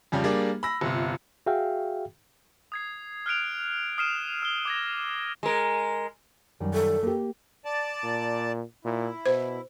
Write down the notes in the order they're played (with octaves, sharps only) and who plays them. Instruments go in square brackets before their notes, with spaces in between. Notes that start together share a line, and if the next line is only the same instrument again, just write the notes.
[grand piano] F2 C#3 G3
G3 A#3 D4 G#4
B5 E6 A#6
G1 C3 F4
[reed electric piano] F#4 G#4 E5 F5 G5
[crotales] D#6 G#6 C7
F6 F#6 C7 D7 F7
D#6 F6 C7 D#7 E7
E6 G7
D6 G#6 A#6
[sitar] G#3 A#4
[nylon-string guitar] F#2 D#3 G3
[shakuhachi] A4
[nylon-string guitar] A#3 G4
[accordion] D5 A5
[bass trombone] A#2
[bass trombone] A#2 [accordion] E4
[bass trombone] B2 [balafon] C5